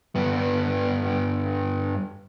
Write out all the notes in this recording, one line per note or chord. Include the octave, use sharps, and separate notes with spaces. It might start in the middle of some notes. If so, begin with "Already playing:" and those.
G2 B3